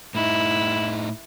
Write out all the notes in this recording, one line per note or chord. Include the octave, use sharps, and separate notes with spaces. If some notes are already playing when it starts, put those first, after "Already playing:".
A2 D#4 E4